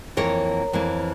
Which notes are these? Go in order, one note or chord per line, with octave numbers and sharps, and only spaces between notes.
F2 E3 A#3 A#4 C#5
F2 E3 A#3